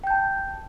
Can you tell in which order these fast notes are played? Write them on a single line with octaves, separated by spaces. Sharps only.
G5 G6 A5